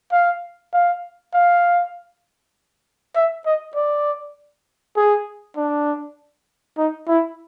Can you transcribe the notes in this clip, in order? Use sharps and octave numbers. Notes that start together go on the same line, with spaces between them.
F5
F5
F5
E5
D#5
D5
G#4
D4
D#4
E4